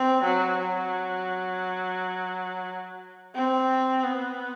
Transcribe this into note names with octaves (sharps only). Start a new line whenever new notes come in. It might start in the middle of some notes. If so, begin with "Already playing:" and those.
Already playing: C4
F#3
F#3
C4
B3